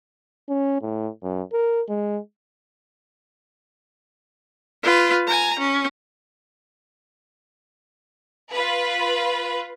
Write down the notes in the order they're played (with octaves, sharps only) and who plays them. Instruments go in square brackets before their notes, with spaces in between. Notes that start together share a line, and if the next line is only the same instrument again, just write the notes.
[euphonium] C#4
A2
F#2
A#4
G#3
[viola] F4 B4
G#5 A#5
C#4
[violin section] F4 B4